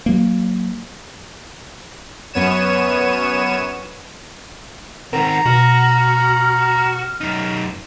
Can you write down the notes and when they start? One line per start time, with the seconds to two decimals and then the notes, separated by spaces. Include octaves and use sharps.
0.06 F#3 A#3
2.33 F#2 B3 C#5 D#7 E7
5.13 D#3 C4 A#4 F#5 A#5
5.46 B2 F#4 F6
7.21 F#2 D#4